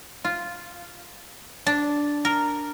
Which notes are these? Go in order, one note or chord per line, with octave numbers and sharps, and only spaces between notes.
F4
D4
A#4